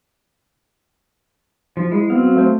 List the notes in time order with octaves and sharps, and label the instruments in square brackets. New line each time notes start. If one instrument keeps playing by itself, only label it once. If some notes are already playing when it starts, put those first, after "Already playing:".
[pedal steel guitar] F3
[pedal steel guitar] G#3 [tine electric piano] E4
[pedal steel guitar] F#3 C4 F5 [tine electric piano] B3
[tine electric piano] A3 C5